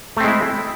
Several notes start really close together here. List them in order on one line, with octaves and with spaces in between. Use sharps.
A3 C4 G#3 E4